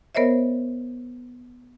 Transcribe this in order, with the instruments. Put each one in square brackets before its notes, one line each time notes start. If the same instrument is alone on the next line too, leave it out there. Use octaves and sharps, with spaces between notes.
[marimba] B3 A#4 C5 C#5 D#5 E5